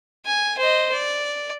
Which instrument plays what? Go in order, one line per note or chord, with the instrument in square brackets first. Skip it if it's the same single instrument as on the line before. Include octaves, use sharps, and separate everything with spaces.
[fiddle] G#5
C5 D#5
D5